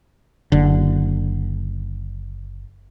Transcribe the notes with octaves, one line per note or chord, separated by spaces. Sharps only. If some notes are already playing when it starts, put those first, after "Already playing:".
F#1 D3